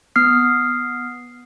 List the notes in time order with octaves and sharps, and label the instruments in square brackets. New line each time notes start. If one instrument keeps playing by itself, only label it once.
[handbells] B3 D#6 F6 C7